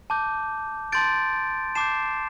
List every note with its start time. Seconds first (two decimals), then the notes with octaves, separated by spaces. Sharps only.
0.10 A5 D6 G6
0.92 A5 C6 G6 A6 D7
1.75 A5 D6 G6 C7 E7